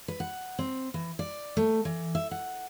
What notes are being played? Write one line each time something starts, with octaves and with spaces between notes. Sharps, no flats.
B4
F#5
C4
E3
D5
A3
E3
E5
F#5